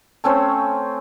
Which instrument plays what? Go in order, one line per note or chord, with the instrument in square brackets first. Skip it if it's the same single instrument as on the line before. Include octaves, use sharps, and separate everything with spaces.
[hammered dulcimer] A3 C4 C#4 C5